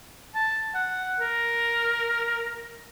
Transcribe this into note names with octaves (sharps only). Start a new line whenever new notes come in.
A5
F#5
A#4